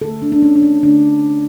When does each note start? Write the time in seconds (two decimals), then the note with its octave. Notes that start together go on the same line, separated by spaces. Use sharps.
0.01 D3 A4
0.04 A3
0.22 D4
0.32 D4
0.42 C#4
0.56 D4
0.62 C#4
0.83 D3 A3 D4